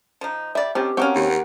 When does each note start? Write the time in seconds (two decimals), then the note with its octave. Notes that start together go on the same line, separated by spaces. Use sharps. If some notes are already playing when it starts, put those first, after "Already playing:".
0.21 F3 D#4
0.55 G3 D5 E5
0.75 D#3 F3 C4 C#4 G4
0.97 C4 C#4 F#4 A#4 C#5 E5 F5
1.15 D#2